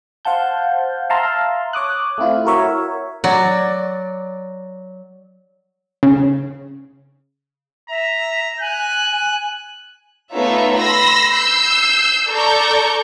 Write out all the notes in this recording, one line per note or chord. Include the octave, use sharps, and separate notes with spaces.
C5 F5 F#5 A5 G6
E5 F5 A5 A#5 C6
C#5 D6 D#6 F#6
A3 C4 E4 F4
E4 F#4 A#4 C#5 E5
F#3 D5
C#3
E5 A#5
G#5 F#6
A3 B3 D#4 F4 C#5 E5
B5 C6 E6 A#6
E6 G6 C7
A4 D5 A5 A#5 C#6 G6